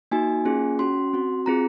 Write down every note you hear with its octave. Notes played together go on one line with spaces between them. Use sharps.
A#3 D#4 F#4 G#5
A#3 C#4 F4 G#4
C#4 F#4 C6
C4 F#4
C4 F4 G#4 A#5